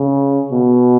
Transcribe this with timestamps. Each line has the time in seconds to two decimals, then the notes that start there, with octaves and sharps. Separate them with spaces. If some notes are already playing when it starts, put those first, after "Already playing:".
Already playing: C#3
0.51 B2